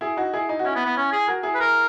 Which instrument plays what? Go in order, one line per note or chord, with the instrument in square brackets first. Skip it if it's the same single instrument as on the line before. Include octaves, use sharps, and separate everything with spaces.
[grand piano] E4 G#4
D#4 F#4
E4 G#4
D#4
F#4
[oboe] C#4 [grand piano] E4
[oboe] B3
B3
C#4
G#4
[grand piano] F#4 A#4
E4 G#4
[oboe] B4
A#4